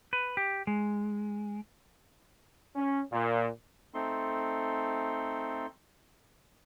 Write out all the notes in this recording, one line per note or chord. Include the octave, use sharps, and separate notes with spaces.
B4
G4
G#3
C#4
A#2
A3 C4 D#4 A4 C6